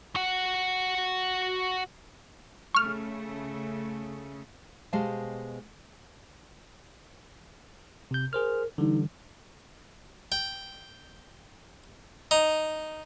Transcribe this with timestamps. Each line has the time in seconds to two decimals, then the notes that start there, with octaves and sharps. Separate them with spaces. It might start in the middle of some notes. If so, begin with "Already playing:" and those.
0.16 F#4 F#5
2.75 C#3 A3 C#6 F6
4.93 B2 G#3 G4 C5 F5 A5
8.11 C3 G6
8.33 G#4 A#4 C5 F6
8.78 D3 E3 G3 D#4
10.32 G5
12.31 D#4